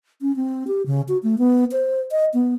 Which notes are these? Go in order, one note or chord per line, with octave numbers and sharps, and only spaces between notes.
C#4
C4
G4
C#3
F#4
A3
B3
C5
D#5
B3